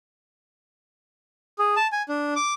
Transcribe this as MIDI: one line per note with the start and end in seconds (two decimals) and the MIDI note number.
1.59 1.75 68
1.76 1.87 81
1.92 2.02 80
2.09 2.34 62
2.36 2.54 86